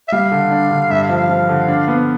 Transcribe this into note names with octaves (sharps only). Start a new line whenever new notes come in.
E5
G3 F5
D3
D4
D3
G2 E5
F5
F3
F5
F3
D3
D4
B3